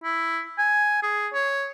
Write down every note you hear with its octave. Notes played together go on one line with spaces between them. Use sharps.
E4
G#5
G#4
C#5